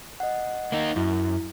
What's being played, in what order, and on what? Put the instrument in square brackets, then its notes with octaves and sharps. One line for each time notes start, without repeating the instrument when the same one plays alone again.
[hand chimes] D#5 F#5
[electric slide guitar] A#3 D#4
[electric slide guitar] F#2 [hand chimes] E4